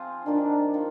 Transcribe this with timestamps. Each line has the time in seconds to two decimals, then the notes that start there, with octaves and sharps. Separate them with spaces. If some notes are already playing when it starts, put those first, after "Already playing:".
Already playing: F3 C4 F4 G#4
0.26 D#3 A#3 D4 F4
0.74 D#3 A#3 F4